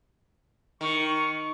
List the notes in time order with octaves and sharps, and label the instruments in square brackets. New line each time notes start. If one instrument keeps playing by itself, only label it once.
[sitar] D#3 [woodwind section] C#6